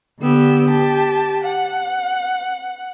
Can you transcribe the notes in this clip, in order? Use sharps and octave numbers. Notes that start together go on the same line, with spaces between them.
D3 B3 G4 E6
G4 A5
F#5